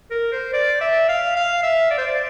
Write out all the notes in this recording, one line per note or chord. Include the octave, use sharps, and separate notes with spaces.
A#4
C5
D5
E5
F5
F5
E5
D5
C5
D5